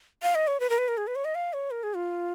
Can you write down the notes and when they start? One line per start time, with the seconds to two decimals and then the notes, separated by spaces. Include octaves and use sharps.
0.23 F5
0.35 D#5
0.47 C#5
0.60 B4
0.70 A#4
0.78 B4
0.88 A#4
0.97 G#4
1.07 B4
1.16 C#5
1.25 D#5
1.35 F5
1.53 C#5
1.71 A#4
1.83 G#4
1.96 F4